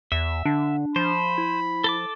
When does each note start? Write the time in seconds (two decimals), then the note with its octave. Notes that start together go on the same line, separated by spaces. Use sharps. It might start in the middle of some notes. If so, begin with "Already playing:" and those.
0.12 E2 E5
0.45 D3 D4
0.96 F3 C5 B5
1.38 E4
1.84 A4 A5 D6